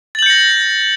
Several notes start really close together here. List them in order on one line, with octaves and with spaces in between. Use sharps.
A6 F#7 G6 C#7 A#6